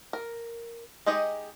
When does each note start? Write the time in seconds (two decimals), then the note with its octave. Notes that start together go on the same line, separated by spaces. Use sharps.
0.13 A#4
1.06 G#3 D#4 G4 G#4 D#5